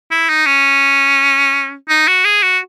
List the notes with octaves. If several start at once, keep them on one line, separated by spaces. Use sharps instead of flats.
E4
D#4
C#4
D#4
F#4
G#4
F#4